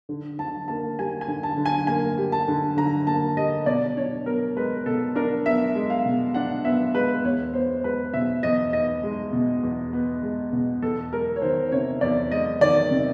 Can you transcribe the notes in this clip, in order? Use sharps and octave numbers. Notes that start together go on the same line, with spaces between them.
D3
D3 A5
A#3 A5
G3 G#5
G#5
D3
A5
D3
G#5
A#3 G#5
G3
A5
D3
D3 A#5
A#3 A5
G3 D#5
B2 D5
D4 C#5
B3 A#4
G#3 B4
B2 A4
D4 A#4
B3 E5
G#3
F5
B2
D4 F#5
B3 E5
G#3 B4
E2 C#5
B3 C5
G#3 B4
B2 E5
E2 D#5
B3 D#5
G#3
B2
E2
B3
G#3
B2
E2 A4
G#3 A#4
C#5
D#3 C5
C3 C#5
E2 D5
G#3 D#5
D#3 D5
C3